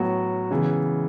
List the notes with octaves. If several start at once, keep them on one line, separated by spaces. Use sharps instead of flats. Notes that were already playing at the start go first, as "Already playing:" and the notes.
Already playing: A2 F#3 B3 F#4 C#5
C#3 E3 G#3 B3